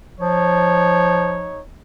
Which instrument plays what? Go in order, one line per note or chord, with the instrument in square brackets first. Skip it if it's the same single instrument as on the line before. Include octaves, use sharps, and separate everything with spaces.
[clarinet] F3 [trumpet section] D#4 C#5